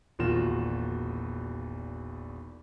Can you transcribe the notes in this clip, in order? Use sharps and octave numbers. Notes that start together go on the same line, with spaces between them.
E1 A#1 D#3 F4 F#4 E7